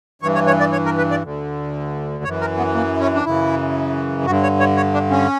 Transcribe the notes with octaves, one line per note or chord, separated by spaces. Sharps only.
G2 E3 C#5
C#5
C#5
D5
C#5
A#4
B4
D5
D2 D3
F#2 E3 C#5
A#4
B3
A#3
C#4
D4
F#2 C#3 E3 E4
G2 D3 F#4
C#5
C#5
C#5
D4
C#4